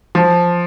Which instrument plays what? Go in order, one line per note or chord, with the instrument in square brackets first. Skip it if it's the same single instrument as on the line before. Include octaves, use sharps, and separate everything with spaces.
[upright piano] F3